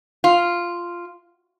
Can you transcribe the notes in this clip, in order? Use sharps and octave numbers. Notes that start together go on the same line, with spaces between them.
F4